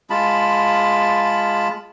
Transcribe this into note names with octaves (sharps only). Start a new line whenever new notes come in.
G#3 F4 A5 B5